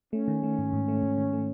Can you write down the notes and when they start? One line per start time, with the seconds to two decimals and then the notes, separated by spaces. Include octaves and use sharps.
0.13 A3 C#4
0.28 D#3
0.43 A3
0.58 G#2
0.73 G#2
0.88 A3
1.03 G#2
1.18 D#3
1.33 A3